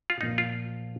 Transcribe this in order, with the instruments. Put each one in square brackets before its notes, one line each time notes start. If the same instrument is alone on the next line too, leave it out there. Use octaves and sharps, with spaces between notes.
[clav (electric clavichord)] F4
[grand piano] A#2 F3 A#3 [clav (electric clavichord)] D#4
[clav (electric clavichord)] F4